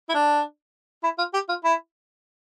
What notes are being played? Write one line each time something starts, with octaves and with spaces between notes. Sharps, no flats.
E4
D4
E4
F4
G4
F4
E4